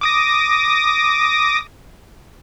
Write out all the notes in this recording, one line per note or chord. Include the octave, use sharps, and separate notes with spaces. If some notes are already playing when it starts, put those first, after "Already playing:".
D6 D#6 A#6